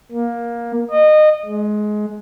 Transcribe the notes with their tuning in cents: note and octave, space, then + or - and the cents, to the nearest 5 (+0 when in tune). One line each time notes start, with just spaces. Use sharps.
A#3 +15
D#5 -25
G#3 +20